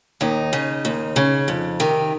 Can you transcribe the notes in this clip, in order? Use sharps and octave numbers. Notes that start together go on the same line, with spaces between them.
D#2 D#4
C#3
D#2
C#3
F2
C3 D#3